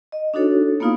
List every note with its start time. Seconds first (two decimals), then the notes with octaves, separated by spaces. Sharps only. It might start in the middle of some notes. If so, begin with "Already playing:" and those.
0.12 D#5
0.34 D4 D#4 F#4 A4 C#5
0.80 A#3 B3 D#4 F4 F5 D#6